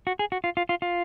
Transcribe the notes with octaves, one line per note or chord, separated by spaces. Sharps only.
F#4
G#4
F#4
F4
F4
F4
F4